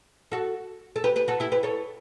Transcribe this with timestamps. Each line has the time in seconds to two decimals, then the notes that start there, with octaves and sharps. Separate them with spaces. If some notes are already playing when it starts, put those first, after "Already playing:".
0.32 F#4 A4
0.96 A4
1.04 G4 B4
1.16 G4 B4
1.28 F#4 A4
1.40 E4 G4
1.52 G4 B4
1.63 A4 C#5